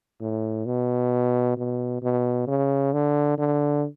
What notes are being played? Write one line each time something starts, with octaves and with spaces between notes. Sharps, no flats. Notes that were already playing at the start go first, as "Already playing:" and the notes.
A2
B2
B2
B2
C#3
D3
D3